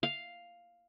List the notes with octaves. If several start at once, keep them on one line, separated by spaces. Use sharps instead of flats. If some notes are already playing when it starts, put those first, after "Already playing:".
F5